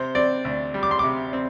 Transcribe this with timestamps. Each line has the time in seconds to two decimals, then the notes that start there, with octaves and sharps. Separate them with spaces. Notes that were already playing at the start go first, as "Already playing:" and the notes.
Already playing: C3 C5
0.15 C4 D5
0.45 D2
0.74 G3
0.83 D6
0.91 C6
0.99 C3 D6
1.33 C4